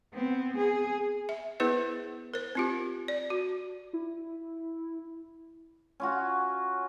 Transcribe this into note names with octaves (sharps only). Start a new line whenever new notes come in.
B3 C4
G#4
E5
B3 E4 G#4 B4 C5
A#4 C5
C4 F4 G4
D5
F#4
E4
C#4 F4 F#4